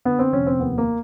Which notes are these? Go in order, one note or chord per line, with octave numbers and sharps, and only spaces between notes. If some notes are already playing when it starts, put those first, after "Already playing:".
D3 B3
C4
F1 C#4
C4
D#2 B3
A#3